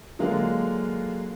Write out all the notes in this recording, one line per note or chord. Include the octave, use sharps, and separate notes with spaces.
D3 F#3 G#3 A#3 F4